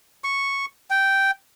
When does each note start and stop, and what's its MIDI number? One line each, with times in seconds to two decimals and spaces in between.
0.24 0.66 85
0.90 1.31 79